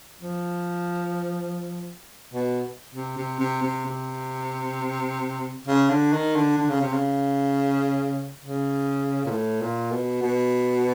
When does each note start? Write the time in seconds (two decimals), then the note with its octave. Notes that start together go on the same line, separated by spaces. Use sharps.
0.21 F3
2.34 B2
2.94 C3
3.17 C3
3.40 C3
3.62 C3
3.85 C3
5.67 C#3
5.90 D3
6.13 D#3
6.35 D3
6.57 D3
6.69 C#3
6.81 C3
6.93 C#3
8.40 C#3
9.25 A#2
9.31 A2
9.61 A#2
9.92 B2
10.22 B2